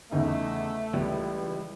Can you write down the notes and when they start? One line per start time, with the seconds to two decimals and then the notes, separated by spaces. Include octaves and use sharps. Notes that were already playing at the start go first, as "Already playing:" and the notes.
0.11 E2 C#3 A3 D#4
0.93 C#2 E3 G3